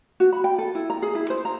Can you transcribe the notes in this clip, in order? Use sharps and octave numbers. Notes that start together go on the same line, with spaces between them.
F#4
B5
G5
A4
E4
A#5
G#4
E4
C5
A#5